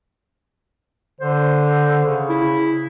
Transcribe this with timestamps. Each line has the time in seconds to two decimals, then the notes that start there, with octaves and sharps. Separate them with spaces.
1.21 D3 C5
2.05 C#3
2.29 E4